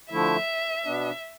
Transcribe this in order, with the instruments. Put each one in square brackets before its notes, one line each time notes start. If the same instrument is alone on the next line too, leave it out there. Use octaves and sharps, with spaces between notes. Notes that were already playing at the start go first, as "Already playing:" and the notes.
[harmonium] D3 F3 A3 E4 [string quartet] E5
[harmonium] B2 B3 D4